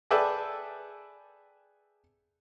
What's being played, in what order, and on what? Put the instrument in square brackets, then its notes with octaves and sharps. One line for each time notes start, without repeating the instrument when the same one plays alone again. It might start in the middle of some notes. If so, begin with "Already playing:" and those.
[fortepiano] G#4 A4 B4 D5 E5 G5